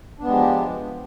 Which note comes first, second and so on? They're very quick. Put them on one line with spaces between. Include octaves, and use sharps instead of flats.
D4 B3 G#3 G4 F3